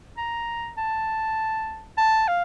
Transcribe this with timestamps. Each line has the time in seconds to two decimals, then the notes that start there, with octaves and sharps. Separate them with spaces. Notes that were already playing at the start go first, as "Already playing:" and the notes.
0.18 A#5
0.77 A5
1.98 A5
2.28 F5